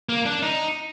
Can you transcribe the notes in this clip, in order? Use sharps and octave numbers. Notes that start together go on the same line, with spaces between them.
A#3
D4
D#4